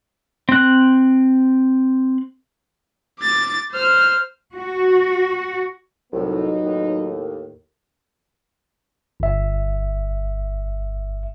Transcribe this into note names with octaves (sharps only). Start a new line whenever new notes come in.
C4 F#6
D6 A6
C5 F6
F#4
C2 A2 F#3 B3 D#4
D#2 A2
G1 E5